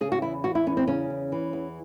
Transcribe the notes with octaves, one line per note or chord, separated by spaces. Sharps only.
C#3 G#4
F#4
E2 E4
E3 F#4
E4
E2 C#4
C4
C#3 C#4
E2
E3
E2